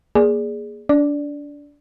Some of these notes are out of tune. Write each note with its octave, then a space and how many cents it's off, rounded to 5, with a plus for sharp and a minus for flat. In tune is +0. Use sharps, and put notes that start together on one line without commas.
A#3 +20 G#4 +0 D5 -5
D4 -25 D5 +0